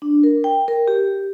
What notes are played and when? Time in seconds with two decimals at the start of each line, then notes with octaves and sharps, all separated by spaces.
0.02 D4
0.23 A#4
0.44 G5
0.68 A#4
0.88 G4